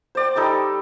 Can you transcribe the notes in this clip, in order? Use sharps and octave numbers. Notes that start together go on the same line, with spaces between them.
C5 D5 G5
G3 D#4 A4 B5